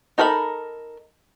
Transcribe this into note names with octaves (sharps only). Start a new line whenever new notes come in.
D#4 A4 A#4 F5 B5